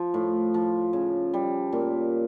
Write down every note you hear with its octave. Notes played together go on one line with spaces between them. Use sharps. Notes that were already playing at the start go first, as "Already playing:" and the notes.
Already playing: F3
A2
F3
C#3
G3
A#2